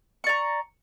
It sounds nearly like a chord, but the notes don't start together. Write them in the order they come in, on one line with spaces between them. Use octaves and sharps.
C#6 D5 A#5